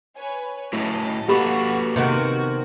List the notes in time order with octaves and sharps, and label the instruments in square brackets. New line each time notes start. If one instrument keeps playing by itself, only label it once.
[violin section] B4 C#5 G#5
[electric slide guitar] A3 E4 F#4 [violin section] C#4 D#5 A5
[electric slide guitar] A#3 A4 B4 [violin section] F#4 [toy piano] G4 B5 C#6
[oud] C3 D#3 B3 [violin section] F#4